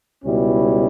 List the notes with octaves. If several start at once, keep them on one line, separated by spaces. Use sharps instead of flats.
C#2 B2 G3 C#4 E4